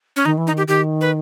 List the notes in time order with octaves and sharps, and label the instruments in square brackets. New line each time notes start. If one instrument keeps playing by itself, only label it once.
[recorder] C#4
[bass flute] D#3 [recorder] D#4
[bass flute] E3
[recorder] D#4
[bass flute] D#3
[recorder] G4
[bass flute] D#3 [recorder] G4
[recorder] B4